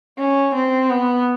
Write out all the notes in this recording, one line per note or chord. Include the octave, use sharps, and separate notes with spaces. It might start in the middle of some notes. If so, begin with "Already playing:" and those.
C#4
C4
B3